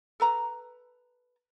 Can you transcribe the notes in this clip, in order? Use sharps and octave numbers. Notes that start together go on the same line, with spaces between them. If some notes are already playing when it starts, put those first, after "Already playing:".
A4 B4 A#5